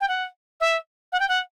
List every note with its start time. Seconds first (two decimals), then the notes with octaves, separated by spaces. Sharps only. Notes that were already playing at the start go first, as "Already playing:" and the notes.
0.01 G5
0.08 F#5
0.60 E5
1.12 F#5
1.20 G5
1.28 F#5